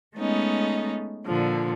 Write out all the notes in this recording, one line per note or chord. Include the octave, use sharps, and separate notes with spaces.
G#3 A3 B3 C#4 D#4
A#2 D3 F3